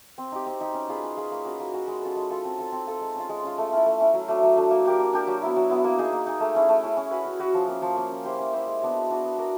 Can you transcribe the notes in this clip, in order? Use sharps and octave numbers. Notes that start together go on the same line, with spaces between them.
C4
D#4 G4
C4
D#4 G4
C#4
F4 G#4 B4
C#4
F4 G#4 B4
A#3
C#4 F#4 B4
A#3
C#4 F#4 B4
G#3
C#4 F4 A4
G#3
C#4 F4 A4
C4
F4 A4
C4
F4 A4
G#3
C#4 F4
G#3
C#4 F4
A3
C#4 E4
A3
C#4 E4
F#3
A3 D4
F#3
A3 D4
A#3
D4 G4 A#4
A#3
D4 G4 A#4
F#3
B3 E4
F#3
B3 E4
A#3
D#4 G#4
A#3
D#4 G#4
A3
C#4 E4 G#4
A3
C#4 E4 G#4
C#4
F#4 B4
C#4
F#4 B4
F3
A#3 C#4
F3
A#3 C#4
C#4
E4 G4 C5
C#4
E4 G4 C5
G#3
B3 D4 F#4
G#3
B3 D4 F#4
B3
D4 F#4 A#4